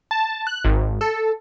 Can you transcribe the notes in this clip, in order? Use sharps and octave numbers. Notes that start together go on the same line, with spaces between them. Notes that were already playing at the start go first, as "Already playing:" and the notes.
A5
F#6
G#1
A4